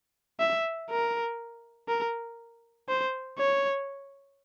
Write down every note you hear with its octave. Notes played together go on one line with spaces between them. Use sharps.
E5
A#4
A#4
C5
C#5